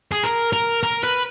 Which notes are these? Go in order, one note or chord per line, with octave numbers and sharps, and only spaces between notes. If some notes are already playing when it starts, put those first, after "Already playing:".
G#4
A#4
A#4
A#4
B4